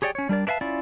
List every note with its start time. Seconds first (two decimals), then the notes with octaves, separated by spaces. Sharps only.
0.02 G4 G#4 C#5 D5 G5
0.15 C#4 C#5
0.29 G3 D4 A#4 D5
0.47 D4 B4 E5 F5 A5
0.61 C#4 E4 F4 D5